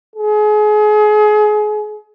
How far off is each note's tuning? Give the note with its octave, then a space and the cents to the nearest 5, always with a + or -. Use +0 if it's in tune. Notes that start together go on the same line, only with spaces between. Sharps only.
G#4 +30